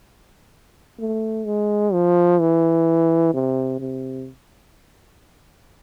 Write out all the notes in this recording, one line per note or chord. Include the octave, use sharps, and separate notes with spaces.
A3
G#3
F3
E3
C3
C3